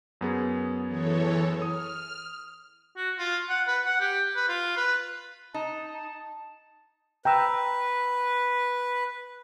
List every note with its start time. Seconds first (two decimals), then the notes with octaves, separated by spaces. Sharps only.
0.21 F#2 B3 G#4
0.88 E3 A4 C#5
1.62 D#6 F6
2.97 F#4
3.18 F4
3.49 F#5
3.68 B4
3.85 F#5
4.00 G4
4.36 B4
4.48 F4
4.77 B4
5.54 D#4 A5
7.25 B4 G5 A#5 E6